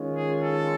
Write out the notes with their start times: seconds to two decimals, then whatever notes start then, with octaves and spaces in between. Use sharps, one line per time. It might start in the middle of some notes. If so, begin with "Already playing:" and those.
Already playing: D#3 G#3 C#4 F4
0.14 G#4
0.42 A4